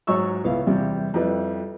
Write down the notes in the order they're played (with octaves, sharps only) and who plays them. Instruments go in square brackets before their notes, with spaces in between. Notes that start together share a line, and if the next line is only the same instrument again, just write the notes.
[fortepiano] G#2 F#3 C#5 C#6 E6
C#2 B3 E4 F5
E2 C3 G3
F2 G3 E4 B4